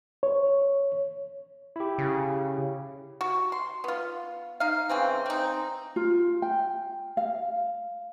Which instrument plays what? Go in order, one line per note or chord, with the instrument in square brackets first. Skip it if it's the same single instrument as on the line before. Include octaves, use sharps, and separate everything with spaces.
[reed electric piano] C#5
[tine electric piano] E4 G4
[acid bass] C#3
[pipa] F#4
C6
B3 F4
D#4 F5
C#3 E3 C4
C4 D#4
[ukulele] F4
G5
F5